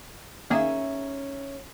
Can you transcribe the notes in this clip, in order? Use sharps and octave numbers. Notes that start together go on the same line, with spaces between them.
D#3 A#3 C#4 D#4 G#4 E5